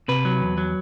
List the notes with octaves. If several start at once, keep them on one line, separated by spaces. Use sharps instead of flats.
C3 B4
F#3
E2
F#3